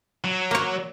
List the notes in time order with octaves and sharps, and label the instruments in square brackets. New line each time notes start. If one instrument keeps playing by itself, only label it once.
[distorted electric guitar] F#3
[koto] A#3 C#5